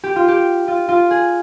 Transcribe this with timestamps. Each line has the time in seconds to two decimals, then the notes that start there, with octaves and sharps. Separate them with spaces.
0.04 G4
0.16 F4
0.28 G4
0.68 F4
0.89 F4
1.11 G#4